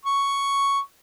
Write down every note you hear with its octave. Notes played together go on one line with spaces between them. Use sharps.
C#6